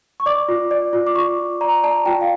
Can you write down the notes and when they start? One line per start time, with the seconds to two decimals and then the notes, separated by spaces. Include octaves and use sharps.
0.20 C#6
0.26 D5 D6
0.48 F4
0.71 D5
0.93 F4
1.07 D6
1.15 F4 C#6
1.38 F4
1.61 D5 A#5
1.83 D5 A5
2.06 F4 G5
2.21 F5